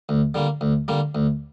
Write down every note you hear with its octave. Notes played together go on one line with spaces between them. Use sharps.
D2
D3 G3 A#3
D2
D3 G3 A#3
D2